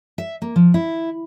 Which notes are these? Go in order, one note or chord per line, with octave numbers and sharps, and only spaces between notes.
E5
A#3
F3
E4